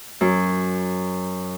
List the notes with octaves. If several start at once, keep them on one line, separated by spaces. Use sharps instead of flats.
F#2